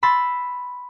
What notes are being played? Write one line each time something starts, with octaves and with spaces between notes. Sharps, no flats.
B5 C6 E6 A6